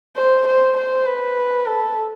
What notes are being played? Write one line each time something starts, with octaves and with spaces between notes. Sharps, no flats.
C5
C5
C5
B4
A4